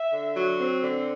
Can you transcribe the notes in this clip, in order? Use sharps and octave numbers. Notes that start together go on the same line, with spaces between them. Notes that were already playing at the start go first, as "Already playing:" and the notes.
Already playing: E5
D3
F#3
C4
D3